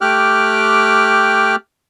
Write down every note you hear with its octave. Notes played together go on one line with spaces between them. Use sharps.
A3 G4 G5 D6 F6 F#6